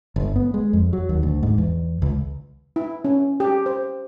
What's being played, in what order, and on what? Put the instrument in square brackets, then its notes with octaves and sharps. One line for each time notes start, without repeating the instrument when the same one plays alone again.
[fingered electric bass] G1
B3
G#3
F2
F#3
D#2
D2
G#2
E2
C#2
[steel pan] E4
C#4
G4
C5